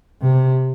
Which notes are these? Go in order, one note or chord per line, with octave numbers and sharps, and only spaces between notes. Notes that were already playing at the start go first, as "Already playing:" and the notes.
C3